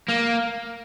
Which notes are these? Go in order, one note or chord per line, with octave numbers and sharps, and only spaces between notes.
A#3